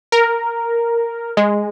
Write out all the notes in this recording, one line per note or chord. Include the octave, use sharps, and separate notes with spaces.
A#4
G#3